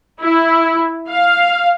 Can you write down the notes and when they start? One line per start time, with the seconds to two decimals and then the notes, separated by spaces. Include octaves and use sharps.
0.22 E4
1.09 F5